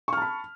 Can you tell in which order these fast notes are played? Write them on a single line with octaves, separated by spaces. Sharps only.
C#6 F6 A5 B5